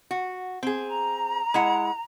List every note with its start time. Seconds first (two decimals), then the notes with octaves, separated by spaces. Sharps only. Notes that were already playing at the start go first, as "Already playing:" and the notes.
0.11 F#4
0.63 C4 G#4
0.87 A#5
1.54 G#3 E4 F#5